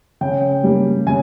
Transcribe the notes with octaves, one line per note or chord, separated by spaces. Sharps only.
C#3 G5
G3 A#3
C#3 G#5